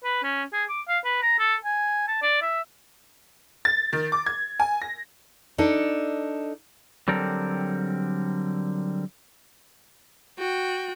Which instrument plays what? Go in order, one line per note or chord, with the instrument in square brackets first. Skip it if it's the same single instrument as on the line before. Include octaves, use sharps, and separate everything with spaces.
[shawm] B4
C#4
G#4
D6
F5
B4
A#5
A4
G#5
A5
D5
E5
[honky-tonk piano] A6
D#3
D6
G#6
G#5
A#6
[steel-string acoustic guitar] D4 D#4 A4
[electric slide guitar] D3 F#3 G3 C4 A4 A#4
[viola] F#4 G5